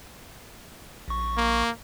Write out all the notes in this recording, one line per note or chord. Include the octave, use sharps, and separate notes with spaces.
A#1 C#6
A#3